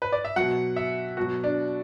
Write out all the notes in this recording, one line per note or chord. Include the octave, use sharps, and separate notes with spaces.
B4
D5
E5
B2 F#3 F#5
E5
B2 F#3 F#4
D4